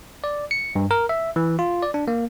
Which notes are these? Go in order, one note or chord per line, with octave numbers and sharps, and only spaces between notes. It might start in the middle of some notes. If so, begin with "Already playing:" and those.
D5
C#7
G2
A#4
E5
E3
F4
D5
D4
A#3